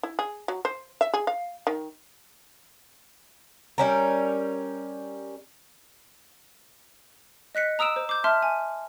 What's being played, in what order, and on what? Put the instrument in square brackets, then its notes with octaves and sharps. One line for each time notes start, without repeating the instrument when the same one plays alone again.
[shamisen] E4
G#4
F#3
C5
E5
G#4
F5
D#3
[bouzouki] G3 C#4 A#4
[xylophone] D#5 F#6 B6 C#7
A#5 D#6 E6 D7 E7
C5
D6 G6
E5 A5 C6 F6
G#5